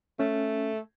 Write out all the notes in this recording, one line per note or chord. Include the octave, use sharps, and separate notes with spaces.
A3 C#4